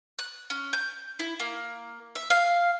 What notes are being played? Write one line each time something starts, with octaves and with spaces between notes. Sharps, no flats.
F#6
C#4
G6
E4
A#3
E5
F5